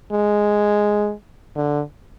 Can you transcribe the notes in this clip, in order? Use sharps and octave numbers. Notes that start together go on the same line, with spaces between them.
G#3
D3